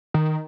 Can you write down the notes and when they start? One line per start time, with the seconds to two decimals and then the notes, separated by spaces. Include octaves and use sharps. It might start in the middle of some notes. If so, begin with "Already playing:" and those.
0.14 D#3